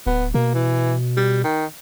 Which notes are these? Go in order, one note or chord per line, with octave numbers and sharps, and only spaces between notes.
D1 B3
B2 A#3
E3
G3
D#3